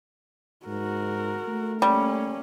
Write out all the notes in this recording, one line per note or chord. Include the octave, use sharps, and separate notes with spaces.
G#2 F#4 A#4
A3
G3 A#3 C#4